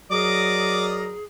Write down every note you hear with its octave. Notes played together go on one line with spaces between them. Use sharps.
F#3 G#4 A#4 D5 D#5 D6